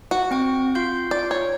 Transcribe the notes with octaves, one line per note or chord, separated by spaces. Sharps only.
F#4
C4 G5 C#6
F4 F5 G6
D5
C#5